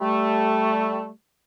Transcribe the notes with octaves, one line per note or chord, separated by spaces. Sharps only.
G3 A3